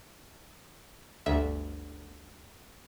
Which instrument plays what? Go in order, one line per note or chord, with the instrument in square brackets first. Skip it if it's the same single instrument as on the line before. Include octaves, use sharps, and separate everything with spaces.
[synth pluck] G1 D2 E5